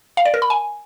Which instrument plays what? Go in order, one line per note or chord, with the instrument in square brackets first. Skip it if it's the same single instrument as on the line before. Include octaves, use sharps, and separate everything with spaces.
[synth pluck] F5
D5
A#4
B5
G#5